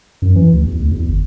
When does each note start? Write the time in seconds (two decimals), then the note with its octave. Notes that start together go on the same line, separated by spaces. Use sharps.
0.22 F#2
0.36 E3
0.54 D2
0.67 E2
0.80 D2
0.92 E2
1.09 G1